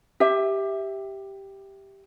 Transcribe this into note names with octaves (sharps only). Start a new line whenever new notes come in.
G4 E5